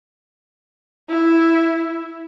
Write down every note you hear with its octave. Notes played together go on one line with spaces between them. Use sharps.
E4